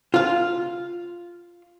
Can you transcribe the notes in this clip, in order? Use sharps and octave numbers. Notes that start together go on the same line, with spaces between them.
F4 F5